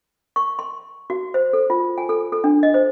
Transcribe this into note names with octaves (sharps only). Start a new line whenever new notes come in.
C#6
C6
F#4
C5
A4
F4
G#5
A4
A4
D4
D#5
C5